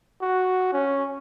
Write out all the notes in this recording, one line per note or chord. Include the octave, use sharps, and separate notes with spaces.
F#4
C#4